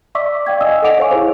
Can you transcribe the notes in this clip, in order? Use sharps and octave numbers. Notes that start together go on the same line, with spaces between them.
D5 E5 C#6 D6 E6 B6
D5 F5 G5 G#6
D#5 E5 G#5 D#6 E6
A4 D#5 F#5 D6 D7 F7
C5 C#5 F5 G#5 C#6
E4 G#4 C5